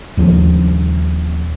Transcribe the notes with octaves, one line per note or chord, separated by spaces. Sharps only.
D#1 D#2 F3